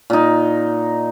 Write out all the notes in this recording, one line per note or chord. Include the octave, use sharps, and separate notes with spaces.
A#2 D#4